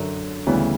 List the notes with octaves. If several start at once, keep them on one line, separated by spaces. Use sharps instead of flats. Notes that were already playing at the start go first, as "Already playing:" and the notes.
Already playing: F#2 D3 F#3
D2 C#3 E3 G3 B3